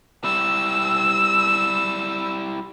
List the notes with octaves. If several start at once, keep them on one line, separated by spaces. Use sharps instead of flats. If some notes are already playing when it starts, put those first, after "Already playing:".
G3 E4 E6